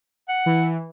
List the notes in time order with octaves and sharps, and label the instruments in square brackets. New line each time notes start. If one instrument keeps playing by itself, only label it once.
[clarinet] F#5
[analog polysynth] E3